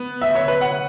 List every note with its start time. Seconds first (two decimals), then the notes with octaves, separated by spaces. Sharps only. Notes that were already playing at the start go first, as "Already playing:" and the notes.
Already playing: B3
0.21 E5
0.35 C#5
0.48 B4
0.61 F#5